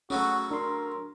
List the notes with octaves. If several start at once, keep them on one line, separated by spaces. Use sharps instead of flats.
C#3 F#3 A3 C#4 F#4
D4 A#4 C6